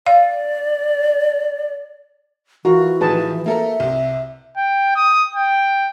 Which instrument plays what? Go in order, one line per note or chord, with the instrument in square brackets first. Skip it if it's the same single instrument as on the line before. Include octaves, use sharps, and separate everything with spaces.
[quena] D5 [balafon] F5
[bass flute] E3 [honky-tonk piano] F4 A#4 [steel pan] F#4
[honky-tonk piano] A2 D#3 F3 [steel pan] G#4 B4 A5
[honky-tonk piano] A#3 A4 A#4 [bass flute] E5
[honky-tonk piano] C2 C3
[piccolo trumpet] G5
D#6
G5